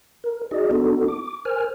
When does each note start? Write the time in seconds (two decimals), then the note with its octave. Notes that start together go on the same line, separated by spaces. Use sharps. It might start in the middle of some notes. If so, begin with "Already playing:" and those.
0.24 A#4
0.51 D#4 F#4 G#4 D5 D#5
0.71 B3 D4 D#4 F#4 A4
1.08 D6
1.45 A#4 C5 G#5 F6